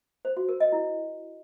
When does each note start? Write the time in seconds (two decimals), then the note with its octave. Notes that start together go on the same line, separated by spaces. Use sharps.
0.25 C5
0.37 F#4
0.49 A#4
0.60 D#5
0.72 E4